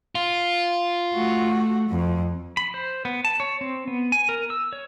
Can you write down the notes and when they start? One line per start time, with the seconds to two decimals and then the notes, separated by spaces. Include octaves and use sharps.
0.15 F4
1.14 A3 F#4
1.89 F2
2.57 B5
2.74 C5
3.05 B3
3.25 A5
3.40 C#5
3.61 C4
3.88 B3
4.12 G#5
4.29 A#4
4.50 E6
4.73 C#5